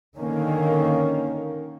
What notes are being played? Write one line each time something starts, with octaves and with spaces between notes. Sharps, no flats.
D3 D#3 A#3 C#4